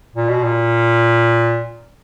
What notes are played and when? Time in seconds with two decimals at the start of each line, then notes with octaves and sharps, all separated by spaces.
0.16 A#2
0.29 B2
0.43 A#2